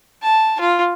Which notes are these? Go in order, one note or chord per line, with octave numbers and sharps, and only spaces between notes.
A5
F4